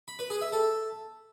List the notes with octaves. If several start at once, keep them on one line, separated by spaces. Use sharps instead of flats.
B5
B4
G#4
E5
A4